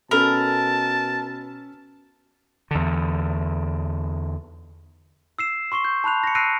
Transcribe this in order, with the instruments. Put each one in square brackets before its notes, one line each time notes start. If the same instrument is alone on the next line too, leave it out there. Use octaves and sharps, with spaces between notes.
[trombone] B2 [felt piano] C#4 A4 B5 [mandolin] A#4 [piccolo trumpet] A5
[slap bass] E2 D3
[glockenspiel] E6 C7 E7
C6 C#6 C7 G7
G6
A5 B5 F#6 F7
A#6 C#7
E6 F#6 A#6 C7 D7 D#7